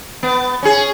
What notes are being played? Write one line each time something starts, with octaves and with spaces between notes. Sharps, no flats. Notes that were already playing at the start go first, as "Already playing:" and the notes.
B3
C#4 G#4